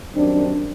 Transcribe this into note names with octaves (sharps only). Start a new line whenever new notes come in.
F#2 D#3 G3 C4 D4